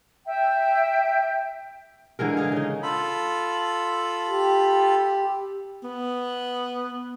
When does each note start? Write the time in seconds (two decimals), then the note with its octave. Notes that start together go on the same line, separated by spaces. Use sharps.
0.26 E5 G5
2.19 D3 E3 G#3 A#4
2.37 G#4 F5
2.52 C#3 D#4
2.83 F4 A4 B5
4.28 G4
5.84 B3